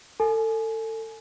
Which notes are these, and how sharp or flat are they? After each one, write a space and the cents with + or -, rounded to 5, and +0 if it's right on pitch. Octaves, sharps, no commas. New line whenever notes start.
A4 +25 G#5 +30